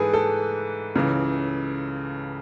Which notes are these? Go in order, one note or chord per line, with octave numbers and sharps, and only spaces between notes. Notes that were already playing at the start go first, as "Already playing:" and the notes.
Already playing: G#2 E3 G#4 A4 B4
A4
C#2 C#3 E3